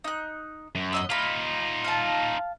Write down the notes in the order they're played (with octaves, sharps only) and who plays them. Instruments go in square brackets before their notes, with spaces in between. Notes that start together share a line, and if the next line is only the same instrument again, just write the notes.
[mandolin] D#4 F#6
[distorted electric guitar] F#2
[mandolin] B3 D#5 E6
[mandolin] A#3 B5 [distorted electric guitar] D#4 F4
[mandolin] F5 A5